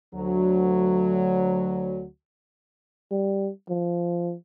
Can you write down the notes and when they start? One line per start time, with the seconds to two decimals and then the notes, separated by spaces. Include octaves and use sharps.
0.14 D2 F#3
3.11 G3
3.69 F3